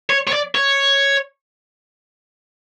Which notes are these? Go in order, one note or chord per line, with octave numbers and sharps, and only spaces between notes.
C#5
C#5
D5
C#5